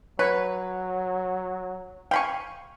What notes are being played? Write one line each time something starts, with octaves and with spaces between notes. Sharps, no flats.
F#3 B4 C#5
F5 G5 G#5 B5 C#6